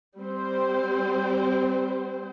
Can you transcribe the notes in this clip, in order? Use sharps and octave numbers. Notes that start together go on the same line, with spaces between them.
G3 C4 C5